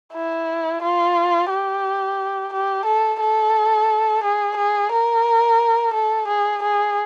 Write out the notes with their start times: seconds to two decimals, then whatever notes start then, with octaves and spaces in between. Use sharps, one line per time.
0.13 E4
0.82 F4
1.50 G4
2.53 G4
2.86 A4
3.21 A4
4.23 G#4
4.57 G#4
4.92 A#4
5.94 A4
6.28 G#4
6.62 G#4